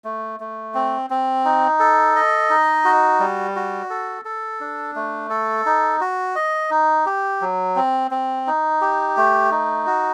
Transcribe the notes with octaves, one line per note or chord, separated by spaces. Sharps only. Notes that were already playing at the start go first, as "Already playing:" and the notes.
A3
A3
C4
C4
D#4
A4
D#5
D#4
F#4
G3
F#4
A4
A4
D4
A3
A4
D#4
F#4
D#5
D#4
G4
F#3
C4
C4
D#4
G4
A3
D#4
F#4